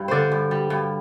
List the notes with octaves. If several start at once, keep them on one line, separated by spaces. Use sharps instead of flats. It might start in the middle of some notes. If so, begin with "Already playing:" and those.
Already playing: G2 G3
D3 C5 D5
G2
G3
G2